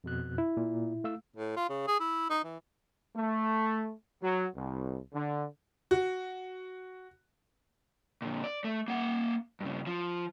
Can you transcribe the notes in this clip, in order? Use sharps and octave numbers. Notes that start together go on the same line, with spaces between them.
F2 B2 F#6
E4
A#2
A3 F5 E6
A2
F4
C#3
G#4
E4
D#4
E3
A3
F#3
C2
D3
F#4
A#2 D3
D5
A3
A#3 F#5
G2 C#3
F3